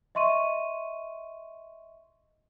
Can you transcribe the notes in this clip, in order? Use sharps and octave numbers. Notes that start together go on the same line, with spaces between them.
D#5 E5 C6 C#6 D#7